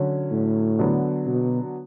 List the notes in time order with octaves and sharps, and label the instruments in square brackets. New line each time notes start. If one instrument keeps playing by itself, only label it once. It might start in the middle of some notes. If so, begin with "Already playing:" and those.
Already playing: [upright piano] D3 F#3 C#4
[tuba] A2
[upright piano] D3 F#3 B3 D4
[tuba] B2